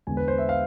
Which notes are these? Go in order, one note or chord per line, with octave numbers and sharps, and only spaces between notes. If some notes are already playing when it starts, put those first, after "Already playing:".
E2 D3 G#3 G#5
B4
C5
E5
F5